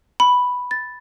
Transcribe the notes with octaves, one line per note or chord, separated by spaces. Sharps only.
B5
A6